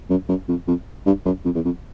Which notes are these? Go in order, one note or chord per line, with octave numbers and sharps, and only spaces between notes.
F#2
F#2
F2
F2
G2
F#2
F2
E2
F2